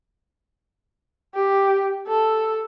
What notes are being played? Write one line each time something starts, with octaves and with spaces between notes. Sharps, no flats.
G4
A4